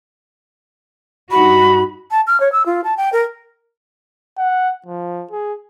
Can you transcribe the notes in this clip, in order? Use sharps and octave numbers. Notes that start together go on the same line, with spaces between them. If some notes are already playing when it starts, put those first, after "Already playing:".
G2 D#4 F#4 B5
A5
F6
C#5
E6
F4
A5
G5
A#4
F#5
F3
G#4